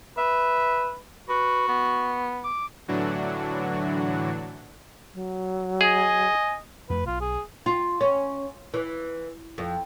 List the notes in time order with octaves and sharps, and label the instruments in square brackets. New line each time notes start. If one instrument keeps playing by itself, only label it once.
[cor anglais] B4 [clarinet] E5
[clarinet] F#4 [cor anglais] B4
[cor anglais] B3
[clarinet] D6
[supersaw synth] A2 D3 E3 F#3 D4 F#4
[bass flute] F#3
[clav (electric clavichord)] G#4 [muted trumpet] D#5 [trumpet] G#5
[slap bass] F2 A3 [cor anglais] B4
[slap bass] B1 [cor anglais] F4
[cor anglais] G#4
[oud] F4
C#4
E3
F2